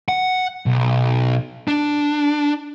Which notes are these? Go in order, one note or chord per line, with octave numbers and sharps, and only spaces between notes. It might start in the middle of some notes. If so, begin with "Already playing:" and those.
F#5
B1
D4